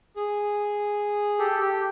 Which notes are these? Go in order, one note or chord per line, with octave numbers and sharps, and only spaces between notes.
G#4
G4 A4
G4